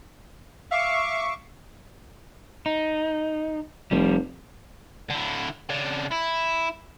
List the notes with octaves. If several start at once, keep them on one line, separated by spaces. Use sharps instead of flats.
E5 F5 C#6 D6
D#4
F1 F3 G3
D3 E4
C#3 D4
E4